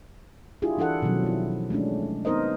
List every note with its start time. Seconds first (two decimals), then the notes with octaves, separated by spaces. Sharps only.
0.62 D4 E4 F4 G4 G#4
0.77 E3 D4 E4 A4 F#5
1.02 B2 D#3 F3 F#3 C#4
1.23 C4 E4
1.70 G#3 A3 C#4 D4
2.25 B3 C4 D#4 A#4 C5 D#5